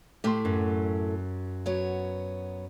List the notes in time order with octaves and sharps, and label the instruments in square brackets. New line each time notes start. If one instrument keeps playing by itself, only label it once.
[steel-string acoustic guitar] A2 A3 [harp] G4 C6
[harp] F#2
[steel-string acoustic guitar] F#3 B3 C#5